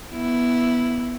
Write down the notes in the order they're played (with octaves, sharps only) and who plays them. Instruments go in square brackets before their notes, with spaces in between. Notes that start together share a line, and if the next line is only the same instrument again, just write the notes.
[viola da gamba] B3 E4